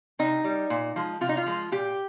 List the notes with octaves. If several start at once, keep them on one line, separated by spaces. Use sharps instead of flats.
C3 D#4
G3
A#2
F3 G#3
C3 F4
D#4
F4
F3 G#3
A#2 G4